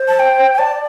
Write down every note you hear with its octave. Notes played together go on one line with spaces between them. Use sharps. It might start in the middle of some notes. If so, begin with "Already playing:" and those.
Already playing: C5
A5
G5
G5
D5 A5